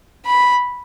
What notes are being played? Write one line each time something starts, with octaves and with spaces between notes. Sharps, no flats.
B5